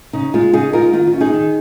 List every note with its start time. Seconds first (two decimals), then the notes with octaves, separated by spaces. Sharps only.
0.13 C#3 D#4
0.34 G#3 D#4 F4
0.53 C#3 D#4 G#4
0.73 G#3 D#4 F4 A#4
0.93 D#3 F4
1.07 F4
1.13 C#4
1.20 D#4 G#4
1.33 D#3